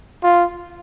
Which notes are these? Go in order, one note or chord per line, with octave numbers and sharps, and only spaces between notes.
F4